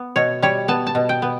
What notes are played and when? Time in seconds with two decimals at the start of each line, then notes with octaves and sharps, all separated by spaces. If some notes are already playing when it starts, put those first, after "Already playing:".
Already playing: B3
0.16 B2 C#5
0.42 G3 C#5
0.68 B3 A5
0.87 A5
0.95 B2
1.09 G5
1.22 B3